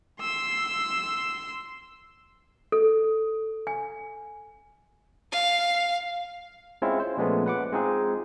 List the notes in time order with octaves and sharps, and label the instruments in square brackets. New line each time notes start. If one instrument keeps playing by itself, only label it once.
[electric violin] C6 E6
[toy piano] A4
G#5
[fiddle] F5
[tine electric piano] G#3 C4 C#4 E4 F4
C5
A#2 F3 G#3 A3 B3 C#4
B4 F#5 D6
G#3 C4 D#4 F4 G#4